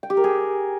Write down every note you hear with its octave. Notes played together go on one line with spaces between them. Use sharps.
G5
G4
A#4
G#4